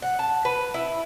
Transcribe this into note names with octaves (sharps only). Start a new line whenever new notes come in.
F#5
A5
B4
E4